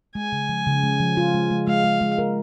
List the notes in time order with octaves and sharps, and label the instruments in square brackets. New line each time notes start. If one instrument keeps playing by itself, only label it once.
[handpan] G#3 [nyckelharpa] G#5
[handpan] C#3
F3
C#3
G#3
F3
F4
G#3
G#3
[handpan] G#3 [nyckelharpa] F5
[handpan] G#3
G#3
A#4